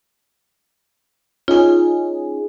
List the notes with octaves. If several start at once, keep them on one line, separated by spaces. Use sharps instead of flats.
C#4 D#4 F4 G#4